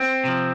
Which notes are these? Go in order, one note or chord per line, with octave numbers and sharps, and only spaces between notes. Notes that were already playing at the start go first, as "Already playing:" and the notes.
Already playing: C4
C3 F3